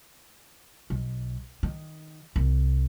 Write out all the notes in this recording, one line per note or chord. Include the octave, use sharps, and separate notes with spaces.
B1
D#3
C2